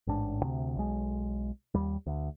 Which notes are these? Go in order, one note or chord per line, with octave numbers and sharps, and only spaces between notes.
A1 G#2 D4
D2 C3
B1 G#3
D#2 G3
D2